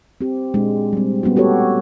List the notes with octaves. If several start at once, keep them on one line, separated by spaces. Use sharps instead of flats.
C4 G4
A#2 G#3 D4
G3 C4
G3 B3 C#4 F#4
A3 F#4 G4 A4 C#5